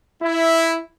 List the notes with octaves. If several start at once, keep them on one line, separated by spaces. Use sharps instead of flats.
E4